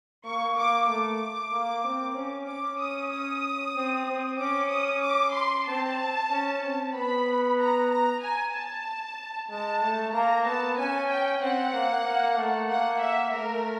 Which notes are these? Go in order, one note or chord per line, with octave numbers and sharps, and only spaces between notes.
A#3 C#6
A#3 D6
A3 D6
A#3
C4
C#4
C#4 D6
D#6
D#6
C4
C4
C#4 D6
D#6
D6
C6
C4 A5
C#4
C4
B3 B5
A#5
A#5
G#5
A5
G#3 A5
A3
A#3 A#5
B3 A5
C#4 G#5
G5
C4 F#5
A#3
A#3
A3
A#3 F#5
E5
A3 A#4